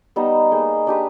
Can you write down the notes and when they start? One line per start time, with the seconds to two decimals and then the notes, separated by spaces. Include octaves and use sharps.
0.16 G3 B3 D#4
0.52 A#3 D#4 G#4
0.87 D4 G4 B4